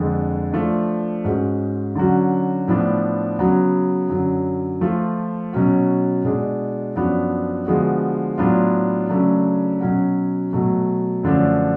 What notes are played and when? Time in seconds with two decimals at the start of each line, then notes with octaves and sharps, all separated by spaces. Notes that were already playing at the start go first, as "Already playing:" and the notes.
Already playing: F2 D3 G#3
0.53 F3 A3 D4 F4
1.24 G#2 G#3 C#4 F#4
1.95 D3 F#3 C#4 F#4
2.68 A2 F3 B3 D4
3.39 C#3 F#3 B3 F#4
4.10 F#2 D3 F#3
4.81 F3 A3 F4
5.53 B2 F#3 C#4 F#4
6.24 B2 G#3 D4
6.95 F#2 F3 B3 D4 F#4
7.66 D3 F3 G#3 B3 F#4
8.38 A2 F#3 B3 D4 F4
9.09 C#3 F#3 A3 D4
9.81 B2 F#3 C#4 F#4
10.53 B2 F#3 A3
11.23 F#2 D3 F3 A3 D4